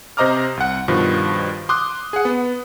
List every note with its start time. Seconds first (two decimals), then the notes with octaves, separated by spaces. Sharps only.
0.17 C3 C5 D#5 A#5 D6 F6
0.57 C2 F#5
0.88 G2 B2 D#3 F3
1.69 C6 D6 D#6 F#6
2.13 G#4 F#5
2.25 B3